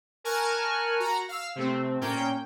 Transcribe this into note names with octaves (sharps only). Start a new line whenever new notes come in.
A#4 G#5 A5 C#6 F6 F#6
F#4 A#5
F5 E6
C3 A3 C4
A#2 A#3 C#4 G5